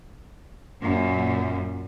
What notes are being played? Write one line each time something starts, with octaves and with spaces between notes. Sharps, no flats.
F#2 A#2